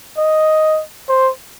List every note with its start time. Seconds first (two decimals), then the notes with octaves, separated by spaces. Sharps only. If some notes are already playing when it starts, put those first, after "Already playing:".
0.18 D#5
1.09 C5